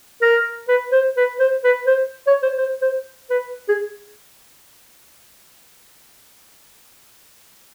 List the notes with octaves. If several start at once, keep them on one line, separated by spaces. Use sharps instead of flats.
A#4
B4
C5
B4
C5
B4
C5
C#5
C5
C5
C5
B4
G#4